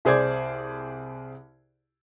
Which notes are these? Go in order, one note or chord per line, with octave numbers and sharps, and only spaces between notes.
C2 G#4 C5 D5 G#6